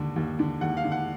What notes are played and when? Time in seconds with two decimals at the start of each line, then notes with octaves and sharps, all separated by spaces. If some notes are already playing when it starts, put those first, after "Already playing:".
Already playing: D#2 D3
0.16 D#2
0.39 D3
0.61 D#2 F#5
0.77 F5
0.84 D3
0.92 F#5